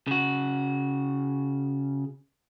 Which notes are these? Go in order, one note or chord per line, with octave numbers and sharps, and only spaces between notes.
C#3 F#4